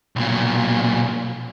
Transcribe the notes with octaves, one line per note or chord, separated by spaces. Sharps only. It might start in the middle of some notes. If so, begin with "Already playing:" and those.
B1 A#2